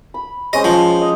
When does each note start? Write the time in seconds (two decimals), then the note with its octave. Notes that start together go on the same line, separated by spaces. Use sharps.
0.14 B5
0.53 G#3 C#4 C5 D#5
0.64 F3
1.01 D#5